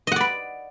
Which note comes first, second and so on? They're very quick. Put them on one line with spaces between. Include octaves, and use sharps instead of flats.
D#5 F#5 D5 B5